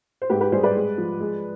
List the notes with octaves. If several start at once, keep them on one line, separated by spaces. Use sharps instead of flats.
C5
G#2 G4 B4
G4 B4
G3 G#4 C5
B4 D5
G#3
F3
G#3